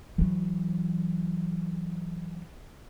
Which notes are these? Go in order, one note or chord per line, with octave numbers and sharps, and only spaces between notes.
E3 F#3